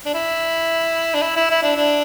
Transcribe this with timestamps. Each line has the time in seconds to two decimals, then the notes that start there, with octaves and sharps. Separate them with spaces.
0.05 D4
0.14 E4
1.14 D4
1.22 E4
1.36 E4
1.50 E4
1.63 D4
1.77 D4